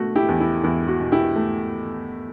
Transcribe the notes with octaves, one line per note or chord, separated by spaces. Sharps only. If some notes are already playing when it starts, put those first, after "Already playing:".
Already playing: B2 A3 F#4
E4 G4
E2
E4
E2 E4
F#4
B2
E4 G4
A3